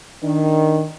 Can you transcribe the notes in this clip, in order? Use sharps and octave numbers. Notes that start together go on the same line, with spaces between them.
D#3 D4